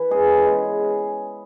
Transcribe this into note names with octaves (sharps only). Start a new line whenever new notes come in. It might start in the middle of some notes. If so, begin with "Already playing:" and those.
Already playing: E3 B4
G#3 C#4 G#4
C#3
G#3
B3
C#3